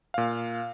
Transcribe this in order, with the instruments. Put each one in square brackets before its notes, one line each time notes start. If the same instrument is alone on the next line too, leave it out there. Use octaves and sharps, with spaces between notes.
[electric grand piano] A#2 F5